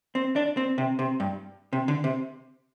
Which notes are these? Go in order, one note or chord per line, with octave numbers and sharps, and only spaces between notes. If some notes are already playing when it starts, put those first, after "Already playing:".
C4
D4
C4
C3
C3
G2
C3
D3
C3